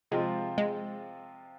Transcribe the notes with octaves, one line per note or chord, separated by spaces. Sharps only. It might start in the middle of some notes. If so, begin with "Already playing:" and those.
C3 F3 G#3 C4 F4
G#3